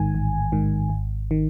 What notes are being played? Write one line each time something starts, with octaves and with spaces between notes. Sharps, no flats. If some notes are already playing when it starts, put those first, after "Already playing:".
Already playing: A1 G#2 D#3 G#5
A1
G#2 D#3
G#1
D#3